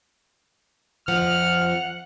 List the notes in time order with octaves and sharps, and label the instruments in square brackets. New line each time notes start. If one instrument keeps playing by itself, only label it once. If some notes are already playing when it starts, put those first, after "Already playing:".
[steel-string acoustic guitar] F2 F3 [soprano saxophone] F#5 [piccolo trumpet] F6